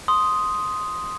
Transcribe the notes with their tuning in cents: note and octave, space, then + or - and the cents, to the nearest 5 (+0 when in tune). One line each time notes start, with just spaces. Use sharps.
C6 +0 D#6 +0